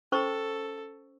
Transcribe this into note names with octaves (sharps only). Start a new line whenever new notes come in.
C#4 A4 C5 C#6